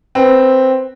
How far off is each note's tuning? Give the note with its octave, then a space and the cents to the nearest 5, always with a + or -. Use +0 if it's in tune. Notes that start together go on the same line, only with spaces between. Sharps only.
C4 +0 B4 +0